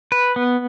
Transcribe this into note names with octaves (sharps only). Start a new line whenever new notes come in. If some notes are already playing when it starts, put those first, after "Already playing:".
B4
B3